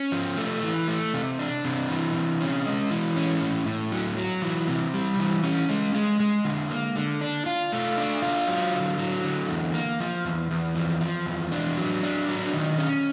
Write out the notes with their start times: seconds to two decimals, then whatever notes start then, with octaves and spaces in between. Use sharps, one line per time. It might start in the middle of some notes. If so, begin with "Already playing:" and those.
Already playing: C#4
0.12 F3
0.37 A3
0.63 E3
0.88 A3
1.13 C3
1.39 D4
1.65 C3
1.89 E3
2.14 C3
2.41 C#4
2.65 G#3
2.90 E3
3.16 C#4
3.42 A2
3.66 A2
3.92 F#3
4.17 F#3
4.42 E3
4.68 C3
4.94 G3
5.19 E3
5.44 C#4
5.69 G#3
5.95 G#3
6.20 G#3
6.45 D3
6.70 A#3
6.96 D3
7.21 D4
7.46 F4
7.72 A3
7.98 D4
8.22 F4
8.47 F#3
8.74 D3
8.98 F#3
9.24 D3
9.49 E2
9.74 A#3
10.00 F3
10.25 E2
10.51 E2
10.75 F3
11.01 F3
11.26 E2
11.52 D4
11.77 F#3
12.03 D4
12.28 F#3
12.53 D#3
12.78 C#4